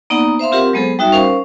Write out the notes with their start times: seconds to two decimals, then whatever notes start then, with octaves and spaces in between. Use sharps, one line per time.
0.10 A#3 B3 D#4 D5 F#5 A#5
0.39 C5 E5 F5 C6
0.52 C4 F4 G4 A#4 F#5
0.73 F#3 G#3 B3 G#4 A4 C5
0.99 G3 D#4 F#4 E5
1.12 C#4 A#4 C5 F5